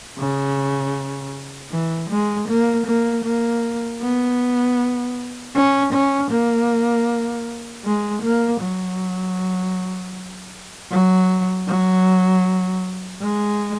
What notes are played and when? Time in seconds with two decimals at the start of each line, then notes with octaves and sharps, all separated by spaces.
0.18 C#3
1.71 E3
2.10 G#3
2.48 A#3
2.87 A#3
3.25 A#3
4.02 B3
5.55 C#4
5.93 C#4
6.31 A#3
7.85 G#3
8.23 A#3
8.61 F#3
10.91 F#3
11.68 F#3
13.21 G#3